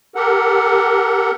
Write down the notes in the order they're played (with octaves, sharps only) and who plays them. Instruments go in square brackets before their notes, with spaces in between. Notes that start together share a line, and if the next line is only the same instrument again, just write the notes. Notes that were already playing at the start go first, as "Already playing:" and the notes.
[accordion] G4 A4 A#4 F#5